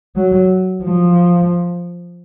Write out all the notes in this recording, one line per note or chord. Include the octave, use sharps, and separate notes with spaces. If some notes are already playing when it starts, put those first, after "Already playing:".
F#3
F3